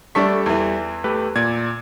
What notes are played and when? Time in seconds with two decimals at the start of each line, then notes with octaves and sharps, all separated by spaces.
0.15 G3 A3 D4 A4 C#6 B6
0.46 E2 E3
1.04 A3 G4 B4
1.36 A#2 D5 G#6